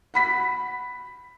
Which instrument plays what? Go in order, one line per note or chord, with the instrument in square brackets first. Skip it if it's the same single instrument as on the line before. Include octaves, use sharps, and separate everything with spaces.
[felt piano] F#5 B5 B6